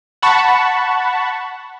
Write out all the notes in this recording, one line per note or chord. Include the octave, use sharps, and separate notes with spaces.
F#5 A5 B5 C#6